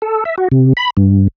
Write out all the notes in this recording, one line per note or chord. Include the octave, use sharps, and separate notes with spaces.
A4
E5
F#4
C3
B5
G2